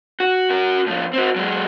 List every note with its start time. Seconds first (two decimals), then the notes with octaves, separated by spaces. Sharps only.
0.20 F#4
0.50 F#4 A#4
0.87 A2 F3
1.13 C4 F#4
1.36 F#3 G#3